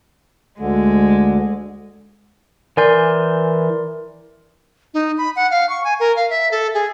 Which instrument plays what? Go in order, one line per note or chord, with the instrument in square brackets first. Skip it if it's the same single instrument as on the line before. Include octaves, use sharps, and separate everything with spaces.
[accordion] D2 D3 [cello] G#3
[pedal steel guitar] E3 G#5 G6 [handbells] A#4 D5 C6
[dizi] D#4
B5
F#5
F5
C#6
G#5
A#4
F5
E5
A4
G#4